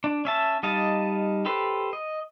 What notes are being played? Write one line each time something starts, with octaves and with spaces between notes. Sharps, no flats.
D4
C#4 E5 A5
G3 D#4 D#5 F5 A5
G4 A4 B4 C5
D#5